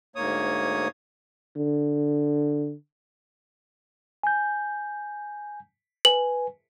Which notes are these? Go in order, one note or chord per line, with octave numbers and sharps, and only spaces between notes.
D2 G#2 A#3 C#5 D#6
D3
G#5 G6
B4 G#5 F#7